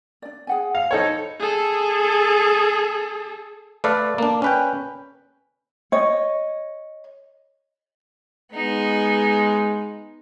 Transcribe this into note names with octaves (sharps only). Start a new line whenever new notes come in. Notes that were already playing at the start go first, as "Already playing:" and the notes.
D4 D5
G#4 F#5 G#5
F5
D#4 A4 C5 C#5 B5
G#4 A4
A3 A4 B4 D5 F5
A#3 D4
C#4 B4 G5
C#5 D#5
G#3 B3 D#4